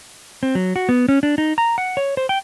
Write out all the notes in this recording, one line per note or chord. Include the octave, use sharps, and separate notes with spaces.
C4
F#3
F#4
B3
C#4
D4
D#4
A#5
F#5
C#5
C5
G5